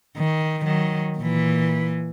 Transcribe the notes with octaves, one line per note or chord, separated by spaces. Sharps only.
D#3
D#3 F#3
A#2 E3